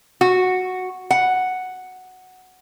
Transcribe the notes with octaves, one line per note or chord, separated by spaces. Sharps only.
F#4
F#5